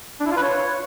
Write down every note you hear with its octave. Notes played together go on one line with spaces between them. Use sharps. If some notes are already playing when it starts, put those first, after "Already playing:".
D4
E4
F4
B4
C#5